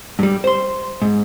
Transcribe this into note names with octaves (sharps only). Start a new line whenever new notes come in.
G2 G3
C5 C6
G#2